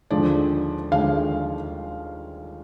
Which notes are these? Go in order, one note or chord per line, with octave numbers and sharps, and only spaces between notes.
D#2 D3 F3 G#3 D5
D#2 D3 F3 G#3 F5